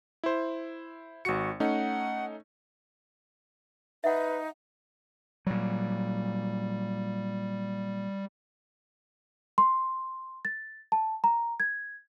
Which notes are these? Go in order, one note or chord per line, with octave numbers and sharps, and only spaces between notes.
E4 C5
G#1 F#4 C#7
A3 C#4 D#4 F#5
D#4 B4 E5 F#5
A#2 F#3 G3
C6
A6
A5
A#5
G#6